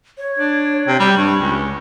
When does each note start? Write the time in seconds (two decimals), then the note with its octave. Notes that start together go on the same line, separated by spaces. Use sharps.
0.18 C#5
0.39 D4
0.87 C3
0.99 G3 B5
1.17 G2 C#6
1.40 C#2